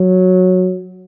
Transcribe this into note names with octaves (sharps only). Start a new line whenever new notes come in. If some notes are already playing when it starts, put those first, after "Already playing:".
Already playing: F#3